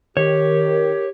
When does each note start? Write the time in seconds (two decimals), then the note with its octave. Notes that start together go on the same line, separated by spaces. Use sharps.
0.17 D#3 G4 A#4 C#5